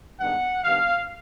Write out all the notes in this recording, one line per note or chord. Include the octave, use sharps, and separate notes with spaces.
G2 D#3 G#3 B3 D4 F#5
D#3 G3 B3 D4 F5